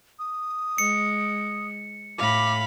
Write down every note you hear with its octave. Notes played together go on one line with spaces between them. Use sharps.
D#6
G#3 C#7
A2 F5 B5 D6